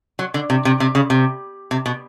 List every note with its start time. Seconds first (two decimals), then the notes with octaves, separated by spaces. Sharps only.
0.19 F#3
0.34 D3
0.50 C3
0.65 C3
0.80 C3
0.95 C#3
1.10 C3
1.71 C3
1.86 B2